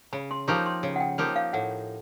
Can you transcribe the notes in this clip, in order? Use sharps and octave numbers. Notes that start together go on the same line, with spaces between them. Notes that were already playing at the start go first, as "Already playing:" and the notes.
C#3 B5
C6
F3 A#3 D#4 G4 C#6
C6
C#3
F#5
G5
F3 A#3 D#4 G4
F5
A2 F#5